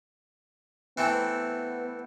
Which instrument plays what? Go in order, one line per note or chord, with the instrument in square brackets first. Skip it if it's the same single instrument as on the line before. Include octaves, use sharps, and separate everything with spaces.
[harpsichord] E3 A3 C4 [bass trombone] B3